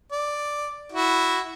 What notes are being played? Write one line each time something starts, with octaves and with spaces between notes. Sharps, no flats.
D5
E4 F#4